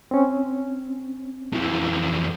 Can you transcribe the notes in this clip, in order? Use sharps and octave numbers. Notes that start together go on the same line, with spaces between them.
C4 C#4
F2 E3